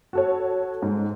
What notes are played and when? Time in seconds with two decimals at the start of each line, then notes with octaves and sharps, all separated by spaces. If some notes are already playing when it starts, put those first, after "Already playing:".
0.13 F#4 A4 C#5
0.82 G#2